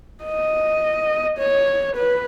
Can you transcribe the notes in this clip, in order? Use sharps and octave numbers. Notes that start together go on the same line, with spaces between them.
D#5
C#5
B4